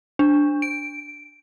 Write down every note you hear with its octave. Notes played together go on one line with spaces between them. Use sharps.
D4
D7